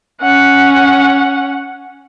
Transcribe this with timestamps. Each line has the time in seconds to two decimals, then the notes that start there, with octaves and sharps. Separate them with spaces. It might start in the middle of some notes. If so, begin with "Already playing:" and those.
0.21 C#4 F#5